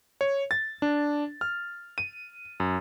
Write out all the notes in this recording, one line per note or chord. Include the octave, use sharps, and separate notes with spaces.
C#5
A6
D4
F6
D#7
F#2